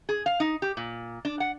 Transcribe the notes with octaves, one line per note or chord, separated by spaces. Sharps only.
G#4
F5
D#4
G4
A#2
D4
F#5